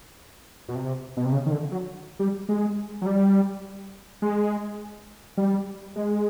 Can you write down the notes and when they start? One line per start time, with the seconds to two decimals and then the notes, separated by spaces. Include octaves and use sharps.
0.69 B2
0.75 C3
1.17 B2
1.25 C3
1.32 C#3
1.46 D#3
1.51 D3
1.71 F#3
2.19 G3
2.49 G#3
3.02 F#3
3.06 G3
4.22 G#3
5.37 G3
5.96 G#3